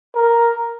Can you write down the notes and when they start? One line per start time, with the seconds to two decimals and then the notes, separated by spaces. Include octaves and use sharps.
0.15 A#4